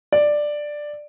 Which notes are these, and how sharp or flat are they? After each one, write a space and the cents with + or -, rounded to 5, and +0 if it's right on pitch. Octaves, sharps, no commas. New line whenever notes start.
D5 +10